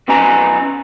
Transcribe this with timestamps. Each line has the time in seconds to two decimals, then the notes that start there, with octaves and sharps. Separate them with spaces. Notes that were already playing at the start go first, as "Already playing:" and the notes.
0.08 B1 B3 C#4 D#5 G#5 A#5